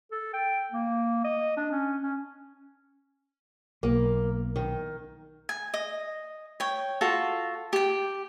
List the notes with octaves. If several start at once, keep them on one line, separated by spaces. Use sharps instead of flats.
A4
G5
A#3
D#5
D4
C#4
C#4
B1 A#3
D#3
G#5
D#5
C#5 G5
F4 F#4 A4
G4 G5